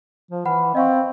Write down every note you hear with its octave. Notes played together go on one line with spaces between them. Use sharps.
F3
E3 F#5 B5 F6
C4 D#5 F5 C#6